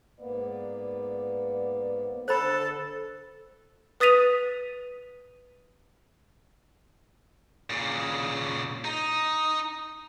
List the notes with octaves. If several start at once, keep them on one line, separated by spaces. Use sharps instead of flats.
G#2 A#3 B3 B4 D5
D3 A4 C5 B5
B4 D#6 A6 B6 D#7 F7
A#2 C#3
D#4